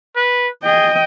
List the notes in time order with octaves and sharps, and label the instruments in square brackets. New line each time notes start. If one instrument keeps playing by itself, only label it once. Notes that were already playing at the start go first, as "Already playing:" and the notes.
[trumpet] B4
[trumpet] G#4 [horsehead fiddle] D#5 G5